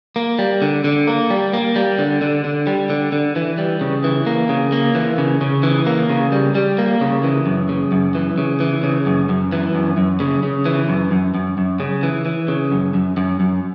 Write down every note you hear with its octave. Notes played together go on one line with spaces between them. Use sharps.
A#3
G3
D3
D3
A#3
G3
A#3
G3
D3
D3
D3
G3
D3
D3
E3
G3
C#3
E3
A#3
C#3
A#3
E3
C#3
C#3
E3
A#3
C#3
G3
G3
A#3
C#3
E3
F#2
C#3
F#2
E3
C#3
E3
C#3
F#2
F#2
E3
F#2
F#2
C#3
C#3
E3
F#2
F#2
F#2
F#2
C#3
E3
E3
C#3
F#2
F#2
F#2
F#2